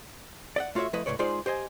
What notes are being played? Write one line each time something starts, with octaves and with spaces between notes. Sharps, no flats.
D5 D#5 F#5
A3 F4 F#4 C#5 E5
F3 A3 E4 B4 D#5
C#2 A2 G3 B4 C#5 D5
G#3 D#4 F4 G#4 C5 D5
G4 C5 D#5 G#5